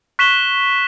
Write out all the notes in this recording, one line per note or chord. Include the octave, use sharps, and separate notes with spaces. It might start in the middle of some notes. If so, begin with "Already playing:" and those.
C#6 F#6 B6 E7 G7